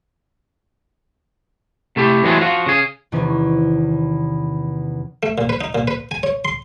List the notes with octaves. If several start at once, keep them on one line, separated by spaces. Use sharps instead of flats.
C3 A3 E4 G4
E3 F#3 G#3 A3 B3 C4
F3 F4 F#4
C#3 G#4
E2 C3 D#3 C#4
A3
A#2
B4
D#4
A#2
B4
G#5
C#5
C6